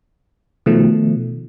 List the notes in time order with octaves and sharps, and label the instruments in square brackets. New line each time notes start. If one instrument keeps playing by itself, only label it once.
[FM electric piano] B2 D#3 F3 A3